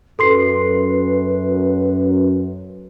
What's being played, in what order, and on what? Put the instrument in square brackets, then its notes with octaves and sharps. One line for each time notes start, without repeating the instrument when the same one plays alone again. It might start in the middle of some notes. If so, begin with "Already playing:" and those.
[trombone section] F#2 [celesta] A4 C6 C7 [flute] B4